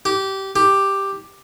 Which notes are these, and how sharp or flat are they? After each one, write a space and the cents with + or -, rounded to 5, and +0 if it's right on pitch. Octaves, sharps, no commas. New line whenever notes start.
G4 -20
G4 +5